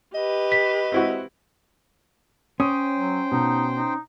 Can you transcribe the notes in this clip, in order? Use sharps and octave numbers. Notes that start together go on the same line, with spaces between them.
G4 B4 D#5
B6
C4 E4 F#4
C#4 C5 G5 D#6
F#3
B2 D#4
D#4